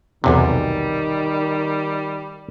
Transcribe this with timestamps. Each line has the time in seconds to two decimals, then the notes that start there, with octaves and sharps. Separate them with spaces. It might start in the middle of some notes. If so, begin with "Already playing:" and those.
0.24 B1 E2 C3 D#3 G3